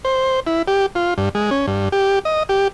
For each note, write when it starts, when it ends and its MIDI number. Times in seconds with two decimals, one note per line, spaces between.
0.05 0.40 72
0.47 0.62 64
0.68 0.86 67
0.95 1.14 65
1.18 1.29 43
1.35 1.50 56
1.51 1.66 61
1.67 1.89 43
1.92 2.19 67
2.25 2.43 75
2.49 2.68 67